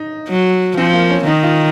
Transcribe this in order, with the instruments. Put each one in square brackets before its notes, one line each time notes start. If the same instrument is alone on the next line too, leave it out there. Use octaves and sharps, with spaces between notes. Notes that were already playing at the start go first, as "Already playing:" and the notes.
Already playing: [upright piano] D#4
[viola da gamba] F#3
[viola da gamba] F3 [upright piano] C4
[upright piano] A#3
C#4
[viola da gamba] D#3 [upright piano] D#4
[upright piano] F4